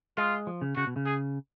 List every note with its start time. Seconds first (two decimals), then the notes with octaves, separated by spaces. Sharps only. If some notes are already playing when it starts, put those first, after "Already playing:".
0.17 G#3 F4
0.47 F3
0.62 C#3
0.76 C#3 F#4
0.87 B2
0.96 C#3
1.06 G#4